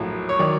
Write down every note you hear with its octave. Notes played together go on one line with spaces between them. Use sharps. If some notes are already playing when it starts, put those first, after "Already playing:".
Already playing: A#1 A2 F#3
C#5
D#3 F#3 D5